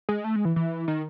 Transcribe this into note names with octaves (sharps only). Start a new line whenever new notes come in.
G#3
A3
G#3
E3
E3
D#3